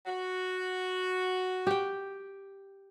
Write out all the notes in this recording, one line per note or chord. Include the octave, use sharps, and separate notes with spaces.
F#4
G4 G5